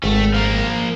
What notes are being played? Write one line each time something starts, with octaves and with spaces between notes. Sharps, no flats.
G#1 A3
F3 A#3